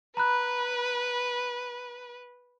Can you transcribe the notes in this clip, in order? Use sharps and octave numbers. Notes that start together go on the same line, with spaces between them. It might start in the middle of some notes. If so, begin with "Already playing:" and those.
B4 A#5 B5 F#6